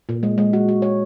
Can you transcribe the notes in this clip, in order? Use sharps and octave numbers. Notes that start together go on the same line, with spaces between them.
A#2
G#3
G#3
F#4
F#4
C#5